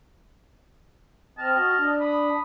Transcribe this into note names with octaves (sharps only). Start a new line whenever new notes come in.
C4 D#5 A5 F6
F#4
D4
B5 D#6